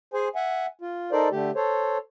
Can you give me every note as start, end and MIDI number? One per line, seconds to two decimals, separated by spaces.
0.14 0.28 68
0.14 0.28 72
0.14 0.28 80
0.35 0.66 76
0.35 0.66 78
0.35 0.66 80
0.81 1.11 65
1.12 1.28 63
1.12 1.28 69
1.12 1.28 70
1.12 1.28 72
1.12 1.28 74
1.31 1.51 50
1.31 1.51 57
1.31 1.51 67
1.55 1.98 69
1.55 1.98 72
1.55 1.98 73